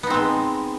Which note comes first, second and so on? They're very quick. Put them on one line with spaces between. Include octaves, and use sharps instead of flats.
B3 D#4 C4 G#3